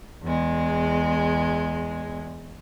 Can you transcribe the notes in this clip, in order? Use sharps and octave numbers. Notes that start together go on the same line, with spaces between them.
E2 G#3